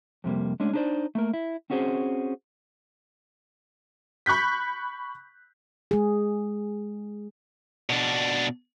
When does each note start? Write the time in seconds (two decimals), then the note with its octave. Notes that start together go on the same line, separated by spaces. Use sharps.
0.24 F2 C3 G3 A#3
0.60 G#3 A3 C#4 D4
0.73 D4 D#4 G4 B4 C5 D5
1.15 A3 A#3 A#4
1.34 E4
1.70 C4 C#4 F#4 G#4 C5
4.26 B5 C#6 F#6 G6 B6
5.91 G#3 G#4
7.90 B2 D4